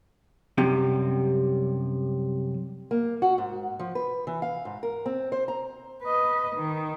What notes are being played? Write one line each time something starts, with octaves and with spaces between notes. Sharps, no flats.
F#2 C3 G3
A#3
F#4
G#2
F3
B4
E3
F5
G#2
A#4
C4
C5
A#5
B4 D#5
D#3